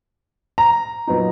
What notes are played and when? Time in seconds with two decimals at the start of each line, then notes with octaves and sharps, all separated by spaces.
0.58 A#5
1.07 A#2 F#3 B3 D#4